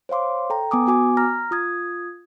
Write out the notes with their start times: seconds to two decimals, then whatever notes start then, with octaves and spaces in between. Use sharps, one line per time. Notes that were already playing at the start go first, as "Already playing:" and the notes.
0.09 C5 C#5 F5 C6 D6
0.50 A4 G5 A#5
0.71 B3 G#5 D6 D#6
0.87 B3 F#4 G#5 D6
1.17 A#5 F6 A#6
1.51 F4 D#6 G#6